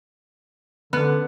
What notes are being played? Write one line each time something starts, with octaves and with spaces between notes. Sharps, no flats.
D3 B3